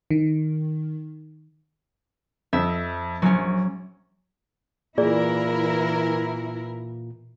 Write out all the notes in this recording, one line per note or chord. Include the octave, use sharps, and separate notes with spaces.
D#3
F2 E5
A#1 F#3 C#4
A#2 E3 E4 G#4 A#4 D5